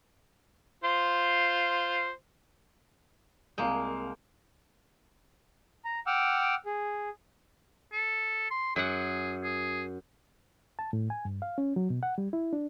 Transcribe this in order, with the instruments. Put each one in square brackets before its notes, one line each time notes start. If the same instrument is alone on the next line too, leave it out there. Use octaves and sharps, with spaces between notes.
[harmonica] F4 C5
[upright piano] C2 F5 G6 [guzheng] G#3 A#3
[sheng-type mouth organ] A#5
F#5 G5 D6 E6 F6
G#4
[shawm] A4
C6
[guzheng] F#2 F#5 [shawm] G#4
[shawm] G#4
[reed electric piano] A5
A2
G#5
G2
F5
C#4
F#3
B2
F#5
G3
E4
D4